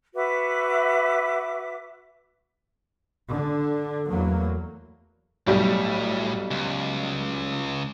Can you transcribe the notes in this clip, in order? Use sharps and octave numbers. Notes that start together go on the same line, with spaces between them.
F#4 B4 E5 D6
D3
E2 F#3 A3 A#3
B1 A2 G3
C#2